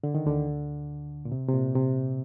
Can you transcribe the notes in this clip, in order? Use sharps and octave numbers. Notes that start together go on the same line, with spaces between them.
D3
D#3
D2 D3
A#2
C3
C3
A#2
C3